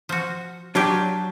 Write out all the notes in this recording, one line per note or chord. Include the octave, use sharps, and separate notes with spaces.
F3 F#4
F#3 D4 F4 G4